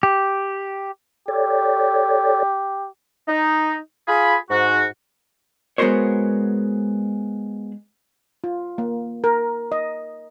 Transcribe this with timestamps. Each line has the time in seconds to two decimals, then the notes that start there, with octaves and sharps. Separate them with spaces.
0.03 G4
1.28 G4 A4 C#5 D5
3.28 D#4
4.08 F4 G#4 B5
4.50 G#2 F#4
5.78 G#3 B3 F#4 A#4 C5 C#5
8.44 F4
8.78 A#3
9.24 A#4
9.72 D#5